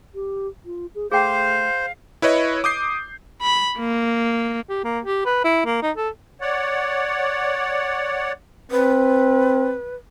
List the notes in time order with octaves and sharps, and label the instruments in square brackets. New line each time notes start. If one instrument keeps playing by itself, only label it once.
[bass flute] G4
F4
G#4
[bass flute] A3 [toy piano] G#4 G5 A5 [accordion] C5 [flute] F5
[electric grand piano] E4 B4 C#5 D#5
D6 D#6 G6 C7
[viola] B5
A#3
[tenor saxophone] G4
A#3
G4
B4
E4
A#3
D#4
A4
[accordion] C#5 D5 F#5
[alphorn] C4 [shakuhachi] B4